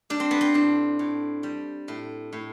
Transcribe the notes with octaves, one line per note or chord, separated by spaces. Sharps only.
G3 D4
C4
B3
C4
A2 D4
A2
G3
A2
A2